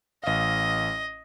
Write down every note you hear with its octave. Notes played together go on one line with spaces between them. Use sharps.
A1 D#5 F5